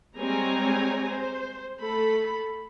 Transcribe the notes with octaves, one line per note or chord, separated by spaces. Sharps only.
G3 G#3 C4 C#5 G#5 A#5
C5
A3 A4 B5